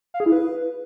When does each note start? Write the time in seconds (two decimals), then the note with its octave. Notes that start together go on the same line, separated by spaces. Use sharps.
0.14 F5
0.20 G#4
0.26 E4
0.32 B4